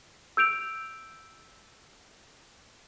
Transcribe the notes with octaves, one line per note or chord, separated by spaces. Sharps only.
E6 G6 D7 F7